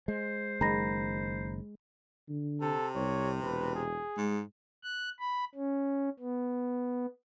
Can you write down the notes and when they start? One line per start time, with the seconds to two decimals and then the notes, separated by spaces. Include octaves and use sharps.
0.08 G#3 C5
0.61 F#1 D#3 G#3 A#5 B5 A#6
2.29 D3
2.61 C3 A4
2.95 C2 C#5
3.43 E1 B4
3.75 G#4
4.18 G#2 G#3
4.84 F#6
5.19 B5
5.55 C#4
6.19 B3